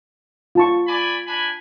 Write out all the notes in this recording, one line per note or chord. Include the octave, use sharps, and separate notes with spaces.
F4 A5 C#6
D5 G#5 B5
D4 G#5 B5